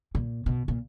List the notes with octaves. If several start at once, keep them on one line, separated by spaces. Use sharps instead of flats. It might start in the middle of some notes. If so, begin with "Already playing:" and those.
A#2
B2
A#2